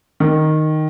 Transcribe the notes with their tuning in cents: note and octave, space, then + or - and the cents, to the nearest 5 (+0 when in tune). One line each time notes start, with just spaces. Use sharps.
D#3 -5